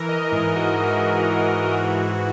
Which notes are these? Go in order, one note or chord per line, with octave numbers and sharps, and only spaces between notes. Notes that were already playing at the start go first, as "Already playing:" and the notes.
Already playing: E3 A#4
D#5
G#2 D#5
F#4
E3
G#2
E3